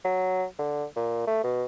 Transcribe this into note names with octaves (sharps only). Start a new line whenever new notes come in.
F#3
D3
A#2
A3
B2